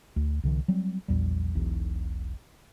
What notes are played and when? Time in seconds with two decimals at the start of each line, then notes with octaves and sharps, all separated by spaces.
0.16 D2
0.44 C2 D3 E3
0.68 F#3 G3 C4
1.08 A#1 E2 G3
1.55 E1 B1 E2